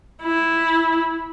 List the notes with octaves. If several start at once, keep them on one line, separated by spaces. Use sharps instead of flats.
E4